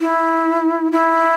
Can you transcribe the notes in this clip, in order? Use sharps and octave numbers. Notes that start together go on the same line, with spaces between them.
E4
E4